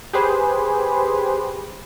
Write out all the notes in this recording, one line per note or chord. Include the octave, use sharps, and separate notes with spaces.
G4 G#4 B4 C5